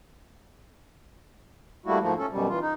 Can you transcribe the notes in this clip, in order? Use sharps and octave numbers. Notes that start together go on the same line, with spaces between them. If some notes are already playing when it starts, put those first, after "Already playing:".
G3 A3 A#3 E4 F#4
G#2 F3 A3 A#3
C#4 A4
F#2 B2 G3
E3 F4
D#4